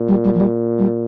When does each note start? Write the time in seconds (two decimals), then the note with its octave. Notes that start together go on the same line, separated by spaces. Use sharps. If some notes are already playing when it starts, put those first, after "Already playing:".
Already playing: A#2
0.08 G3
0.24 G3
0.34 F3
0.40 G3
0.79 G3